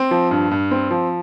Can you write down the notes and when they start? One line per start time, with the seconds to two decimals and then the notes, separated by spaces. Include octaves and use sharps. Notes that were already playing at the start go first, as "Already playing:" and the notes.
Already playing: C4
0.11 F3
0.31 G2
0.51 G2
0.71 C4
0.91 F3